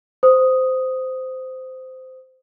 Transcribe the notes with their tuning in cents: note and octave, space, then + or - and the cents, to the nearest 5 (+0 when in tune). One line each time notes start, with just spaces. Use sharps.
C5 -15 D#6 +0